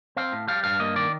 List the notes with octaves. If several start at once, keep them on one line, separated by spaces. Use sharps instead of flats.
C4 F5
A2
G3 F5
G2 F5
A#3 D#5
D#3 D5